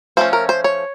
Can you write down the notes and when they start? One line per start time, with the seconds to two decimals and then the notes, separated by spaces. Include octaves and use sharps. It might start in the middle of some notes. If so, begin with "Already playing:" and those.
0.17 F3 A3 C#4 C5
0.33 A#4
0.49 C5
0.64 C#5